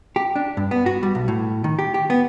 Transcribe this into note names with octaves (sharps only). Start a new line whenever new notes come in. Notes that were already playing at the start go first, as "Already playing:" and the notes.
G4
D4
G2
B3
F#4
G3
B1
A2
D#3
G4
G4
B3